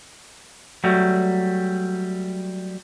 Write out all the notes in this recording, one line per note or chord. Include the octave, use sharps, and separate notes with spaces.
F#3 G3 A3